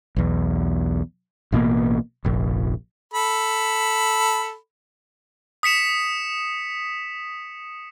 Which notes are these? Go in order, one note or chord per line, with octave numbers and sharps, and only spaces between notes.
B1 E2
A1 B2 D3 A#3
F1 A#1
A4 B5
D#6 B6 C#7 E7